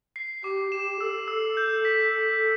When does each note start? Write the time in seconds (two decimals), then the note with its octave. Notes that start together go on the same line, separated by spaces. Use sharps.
0.16 C7
0.43 G4 D6
0.72 G4 E7
1.01 A4 E6
1.28 E6
1.57 G6
1.85 B6